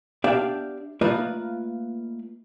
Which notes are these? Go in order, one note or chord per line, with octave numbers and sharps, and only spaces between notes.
B3 D4 G4 D5 E5 F5
A3 A#3 F4 B4 D5 D#5